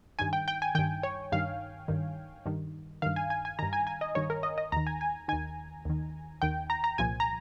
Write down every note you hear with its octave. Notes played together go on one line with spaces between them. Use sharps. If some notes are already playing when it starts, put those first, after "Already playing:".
G2 D#3 G#5
G5
G5
G#5
G2 D#3 G5
C#5
G2 D#3 F5
G2 D#3
G2 D#3
G2 D#3 F5
G#5
G#5
G#5
G2 D#3 A#5
G#5
G#5
D#5
G2 D#3 C#5
A#4
D#5
D#5
D#2 D#3 A#5
G#5
G#5
D#2 D#3 G#5
D#2 D#3
D#2 D#3 G5
A#5
A#5
C2 A#2 F3 G#5
A#5